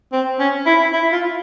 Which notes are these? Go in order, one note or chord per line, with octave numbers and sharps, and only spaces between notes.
C4
C#4
E4
E4
F4